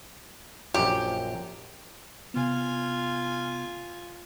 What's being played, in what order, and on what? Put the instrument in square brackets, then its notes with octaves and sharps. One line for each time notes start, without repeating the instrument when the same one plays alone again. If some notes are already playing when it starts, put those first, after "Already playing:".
[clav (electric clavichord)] A#1 F#2 [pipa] G4
[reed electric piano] C3 B3 [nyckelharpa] F4 G#5